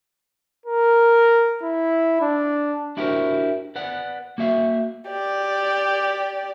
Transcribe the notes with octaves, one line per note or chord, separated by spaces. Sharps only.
A#4
E4
D4
D4 E4 F#4 G4 A#4 C5
B4 D5 F#5
A#3 F#4 E5 F5
G4 D5